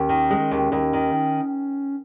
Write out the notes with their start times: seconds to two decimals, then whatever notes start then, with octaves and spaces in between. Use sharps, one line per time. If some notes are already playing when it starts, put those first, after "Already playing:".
Already playing: D#2 C#4
0.09 D#3
0.31 G#3
0.51 D#2
0.72 D#2
0.93 D#3